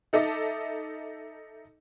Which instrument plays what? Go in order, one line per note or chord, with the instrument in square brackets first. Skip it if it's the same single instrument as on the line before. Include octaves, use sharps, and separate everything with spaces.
[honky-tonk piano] D#4 A4 D#5 E5 D6